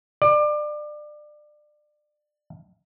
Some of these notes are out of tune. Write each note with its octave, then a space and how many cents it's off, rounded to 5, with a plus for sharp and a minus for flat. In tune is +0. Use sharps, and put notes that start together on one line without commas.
D5 +25